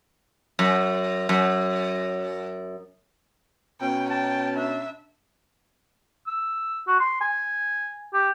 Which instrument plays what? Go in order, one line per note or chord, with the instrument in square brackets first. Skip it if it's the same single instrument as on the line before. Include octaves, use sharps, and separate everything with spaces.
[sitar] F#2
F#2
[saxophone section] B2 C#4 [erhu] G5
[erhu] G5 [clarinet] A5
[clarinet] D4 [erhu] E5
[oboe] E6
F#4
C6
G#5
G4